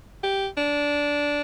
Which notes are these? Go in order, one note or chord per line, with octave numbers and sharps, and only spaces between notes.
G4
D4